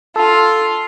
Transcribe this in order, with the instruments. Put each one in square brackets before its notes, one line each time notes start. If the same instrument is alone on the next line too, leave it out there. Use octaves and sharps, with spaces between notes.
[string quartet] F4 [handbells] A4 A5 E6